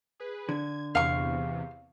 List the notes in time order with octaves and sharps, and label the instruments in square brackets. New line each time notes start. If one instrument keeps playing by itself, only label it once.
[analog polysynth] G#4 B4
[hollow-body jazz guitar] D3 [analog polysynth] G#6
[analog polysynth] E2 C3 [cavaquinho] F5 C#6